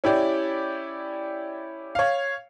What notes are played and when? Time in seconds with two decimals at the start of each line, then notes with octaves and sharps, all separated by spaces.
0.04 C#4 E4 G4 D5
1.95 C#5 F5